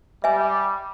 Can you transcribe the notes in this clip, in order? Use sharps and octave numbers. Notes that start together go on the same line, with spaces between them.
G3 E5 G#5